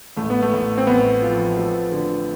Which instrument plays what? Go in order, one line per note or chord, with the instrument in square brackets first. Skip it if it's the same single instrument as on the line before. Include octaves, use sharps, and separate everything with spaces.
[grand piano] A1 [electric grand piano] A3
[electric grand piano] B3
A3
[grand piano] A1
[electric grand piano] C4
[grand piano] A1 [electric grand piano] B3
[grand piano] F3
A3
D3